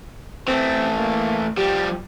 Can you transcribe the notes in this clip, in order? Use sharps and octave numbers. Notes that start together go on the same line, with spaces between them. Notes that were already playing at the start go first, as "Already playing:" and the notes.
E3 A3 C4
A#3
F3 G3 G4